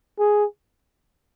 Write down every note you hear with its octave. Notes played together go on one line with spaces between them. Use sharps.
G#4